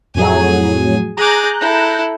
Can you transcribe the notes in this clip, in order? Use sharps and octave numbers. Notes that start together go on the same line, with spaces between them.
F2 A2 F#3 G#4 G#5
G#4 A#5 D6 F#6 G6
E4 A4